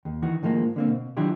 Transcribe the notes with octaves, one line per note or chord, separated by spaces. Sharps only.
D#2
D#3 E3 F#4
A2 D#3 F3 G#3 A#3
D3 A#3 C4
B2
D#3 F#3 D4 E4 F4 G4